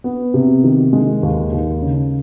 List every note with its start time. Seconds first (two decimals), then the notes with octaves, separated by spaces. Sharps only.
0.04 B3
0.34 C3
0.64 D#3
0.93 G#3
1.23 D#2
1.52 D#2
1.82 C#3